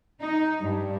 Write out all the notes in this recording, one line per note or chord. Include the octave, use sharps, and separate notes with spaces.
D#4
G2